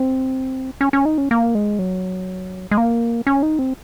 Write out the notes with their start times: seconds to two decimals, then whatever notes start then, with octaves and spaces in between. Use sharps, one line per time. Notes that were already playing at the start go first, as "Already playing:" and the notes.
Already playing: C4
0.81 C#4
0.93 C#4
1.05 D#4
1.18 C#4
1.31 A#3
1.55 G#3
1.79 F#3
2.71 G#3
2.77 A#3
3.27 C#4
3.43 D#4
3.59 C4